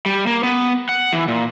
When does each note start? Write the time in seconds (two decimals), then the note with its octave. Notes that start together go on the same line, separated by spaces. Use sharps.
0.06 G3
0.27 A#3
0.43 B3
0.89 F#5
1.13 E3
1.28 A#2